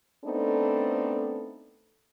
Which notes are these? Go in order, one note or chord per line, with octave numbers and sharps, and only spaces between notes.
A3 B3 C4 D4 D#4 A4